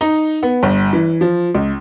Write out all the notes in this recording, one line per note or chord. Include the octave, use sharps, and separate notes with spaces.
D#4
B3
G1
E3
F3
C#2